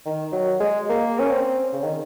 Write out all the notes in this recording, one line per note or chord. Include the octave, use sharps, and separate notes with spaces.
D#3
F#3
G#3
A#3
C#4
C4
C#3
D#3